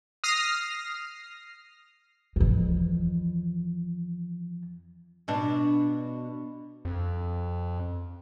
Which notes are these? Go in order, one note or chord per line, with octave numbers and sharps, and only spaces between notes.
D#6 F6 A#6 C7
F2 E3
B2 D4
F2